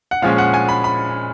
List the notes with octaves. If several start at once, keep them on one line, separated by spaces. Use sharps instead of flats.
F#5
A#2 F3 G#3 C#4 F5
F#5
G#5
B5
B5